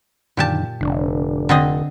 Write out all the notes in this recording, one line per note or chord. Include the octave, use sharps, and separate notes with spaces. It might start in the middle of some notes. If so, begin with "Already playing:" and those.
F#2 A#2 D3 D#3 G4 A5
F1 D3 D4
D3 C4 D#5